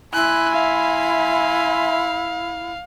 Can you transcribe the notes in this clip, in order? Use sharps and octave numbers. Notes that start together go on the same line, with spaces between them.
E4 G#5 B5 C6 F#6
E5 F5